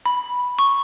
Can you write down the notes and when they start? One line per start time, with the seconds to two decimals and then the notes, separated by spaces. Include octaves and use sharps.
0.06 B5
0.59 C#6